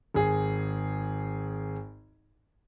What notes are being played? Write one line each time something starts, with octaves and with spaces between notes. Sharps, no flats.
G#1 G#4